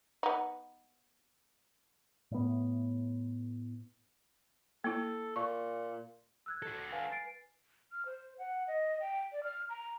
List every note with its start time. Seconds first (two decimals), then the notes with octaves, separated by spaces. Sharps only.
0.23 B3 D#4
2.31 A2 B3
4.84 A#3 E4 A4
5.36 A#2 C#6
6.46 E6 F#6 G#6
6.62 F#4 A4
6.92 B4 F5 G#5
7.12 A6 C7 D7
7.92 F6
8.06 C5
8.38 F#5
8.67 D#5
9.00 G5
9.32 D5
9.43 F6
9.69 A#5